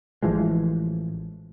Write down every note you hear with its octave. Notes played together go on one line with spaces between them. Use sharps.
A1 E3 F3 G#3